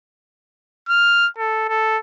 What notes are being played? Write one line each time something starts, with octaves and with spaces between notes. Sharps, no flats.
F6
A4
A4